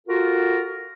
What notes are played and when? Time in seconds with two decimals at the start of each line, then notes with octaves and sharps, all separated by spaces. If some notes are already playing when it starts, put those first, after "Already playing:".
0.07 F4 F#4 A4 A#4